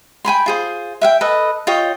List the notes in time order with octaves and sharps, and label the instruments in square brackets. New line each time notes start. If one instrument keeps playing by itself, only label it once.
[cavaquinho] G5 G#5 B5 C6
F4 G#4 C5
E5 F5 G5
A4 B4 D#5
F4 C#5 D#5 G5